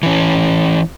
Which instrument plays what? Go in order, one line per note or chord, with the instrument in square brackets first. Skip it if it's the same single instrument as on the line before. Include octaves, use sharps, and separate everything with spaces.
[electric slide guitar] E3 C#4